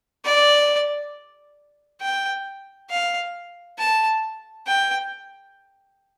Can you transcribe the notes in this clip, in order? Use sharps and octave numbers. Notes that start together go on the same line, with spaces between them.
D5
G5
F5
A5
G5